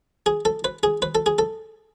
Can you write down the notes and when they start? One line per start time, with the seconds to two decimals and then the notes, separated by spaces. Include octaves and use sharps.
0.26 G#4
0.45 A4
0.64 B4
0.83 G#4
1.02 B4
1.15 A4
1.26 G#4
1.39 A4